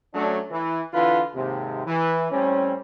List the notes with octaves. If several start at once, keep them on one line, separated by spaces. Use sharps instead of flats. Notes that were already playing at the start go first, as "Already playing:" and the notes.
F#3 A3 C#4 D4
E3
D3 E3 E4 F4 B4
D#2 G#2 C3
E3
A2 G3 C4 C#4